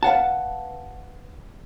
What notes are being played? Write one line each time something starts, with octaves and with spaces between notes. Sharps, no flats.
B4 F5 F#5 A5